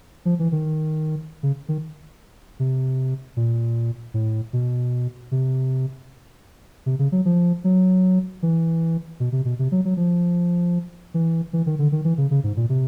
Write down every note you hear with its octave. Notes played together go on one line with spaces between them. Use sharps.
F3
E3
D#3
C#3
D#3
C3
A#2
A2
B2
C3
C3
C#3
F#3
F3
F#3
E3
B2
C3
B2
C3
F#3
F#3
F3
E3
E3
D#3
D3
D#3
E3
C#3
C#3
G#2
A#2
C3